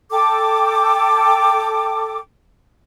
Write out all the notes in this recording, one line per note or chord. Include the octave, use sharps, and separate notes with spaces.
A4 G5 D6